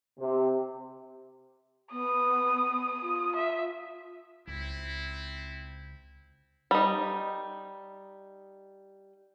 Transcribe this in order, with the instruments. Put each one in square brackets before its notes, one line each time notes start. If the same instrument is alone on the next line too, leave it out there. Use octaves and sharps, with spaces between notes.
[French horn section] C3
[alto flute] B3 [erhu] D#6
[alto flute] F4
[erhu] E5
[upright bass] C#2 [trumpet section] C4 E4
[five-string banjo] G3 D#4